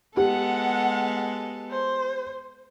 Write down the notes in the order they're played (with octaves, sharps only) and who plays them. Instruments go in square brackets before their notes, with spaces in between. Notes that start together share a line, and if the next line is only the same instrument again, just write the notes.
[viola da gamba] G#3 B3 A4 [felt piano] G4 [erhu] F#5
[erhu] C5